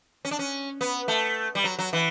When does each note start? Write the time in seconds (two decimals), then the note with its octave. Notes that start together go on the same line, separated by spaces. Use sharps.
0.25 C#4
0.31 D4
0.39 C#4
0.81 B3
1.08 A3
1.55 G3
1.64 F#3
1.79 F#3
1.93 E3